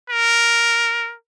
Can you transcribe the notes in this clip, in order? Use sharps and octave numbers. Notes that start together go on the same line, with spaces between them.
A#4